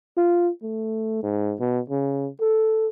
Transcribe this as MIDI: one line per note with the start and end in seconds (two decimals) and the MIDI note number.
0.17 0.50 65
0.63 1.22 57
1.23 1.55 44
1.60 1.79 47
1.90 2.28 49
2.41 2.88 69